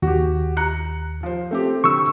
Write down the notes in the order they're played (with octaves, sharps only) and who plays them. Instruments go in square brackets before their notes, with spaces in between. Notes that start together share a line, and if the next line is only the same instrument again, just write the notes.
[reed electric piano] D#2 [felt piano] F#4 G4
[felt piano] A#5 F#6 C#7
F3 C5
A3 C4 G4
[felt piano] D2 [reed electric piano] C#6 E6